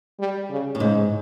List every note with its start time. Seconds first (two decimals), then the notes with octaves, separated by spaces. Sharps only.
0.20 G3
0.50 C#3
0.75 A2
0.80 G#2 C#3